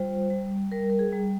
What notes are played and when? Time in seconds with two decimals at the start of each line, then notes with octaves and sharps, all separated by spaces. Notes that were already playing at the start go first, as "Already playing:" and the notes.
Already playing: G3 F4 C5
0.30 G3
0.72 G3 A#4
0.90 A#4
0.99 G#4
1.13 G3